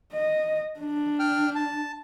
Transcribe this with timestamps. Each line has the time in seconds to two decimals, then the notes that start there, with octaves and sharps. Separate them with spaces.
0.13 D#5
0.80 D4
1.19 G5 F6
1.55 A5